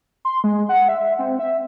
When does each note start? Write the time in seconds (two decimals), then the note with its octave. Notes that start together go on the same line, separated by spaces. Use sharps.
0.25 C6
0.44 G#3
0.69 F#5
0.88 E5
1.19 C4
1.39 E5